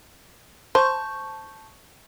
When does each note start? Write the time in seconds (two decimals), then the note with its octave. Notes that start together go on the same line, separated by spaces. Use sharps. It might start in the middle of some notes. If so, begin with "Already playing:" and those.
0.75 C5 A5 C#6 G6